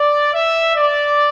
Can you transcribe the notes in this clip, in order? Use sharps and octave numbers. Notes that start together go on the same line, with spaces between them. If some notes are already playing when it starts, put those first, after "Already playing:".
Already playing: D5
E5
D5